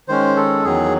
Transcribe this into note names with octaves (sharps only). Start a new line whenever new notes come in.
D#3 G#3 C#4 C5
A4
E2 D#3 F#3 G#4